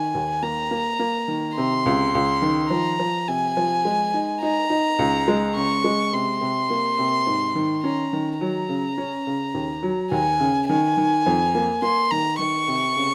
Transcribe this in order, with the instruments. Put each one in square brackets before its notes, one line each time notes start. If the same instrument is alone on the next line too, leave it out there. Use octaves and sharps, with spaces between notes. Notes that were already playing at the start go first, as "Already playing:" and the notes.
Already playing: [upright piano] D#3 [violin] G#5
[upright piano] D#2
[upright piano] A#3 [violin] A#5
[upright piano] A#3
A#3
D#3
[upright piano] C3 [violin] C6
[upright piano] C#2
C#2
D#3
[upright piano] F3 [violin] A#5
[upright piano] F3
[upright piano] C3 [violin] G#5
[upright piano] F3
G#3
D#4
[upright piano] D#4 [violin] A#5
[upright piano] D#4
C#2
G#3
[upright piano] C#3 [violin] C#6
[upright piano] G#3
[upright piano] C3 [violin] C6
[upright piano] C3
A#3
C3
G#2
D#3
[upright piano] C#4 [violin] A#5
[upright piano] D#3
[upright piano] F#3 [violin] A#5
[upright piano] C#3
C#4
C#3
D#2
F#3
[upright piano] D#2 [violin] G#5
[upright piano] C#3
[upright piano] D#3 [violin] G#5
[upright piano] D#3
F2
A#3
[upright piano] A#3 [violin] C6
[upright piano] D#3 [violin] A#5
[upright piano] D#3 [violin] C#6
[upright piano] C3
C#3